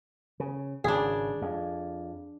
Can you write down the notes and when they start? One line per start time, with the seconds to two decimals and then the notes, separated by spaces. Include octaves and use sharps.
0.40 C#3
0.84 G#1 C#3 D4 G#4
1.42 F2